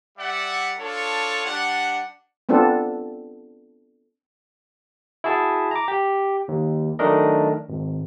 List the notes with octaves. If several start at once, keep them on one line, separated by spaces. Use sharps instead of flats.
G3 D5 E5 F#5
D4 F4 A4 C#5
G3 D4 F#5
B3 C4 D4 F4 A4
E4 F#4 G#4 A5
A#5 D6
G4
D#2
D#3 F#3 A3 D4 A#4 D#5
G#1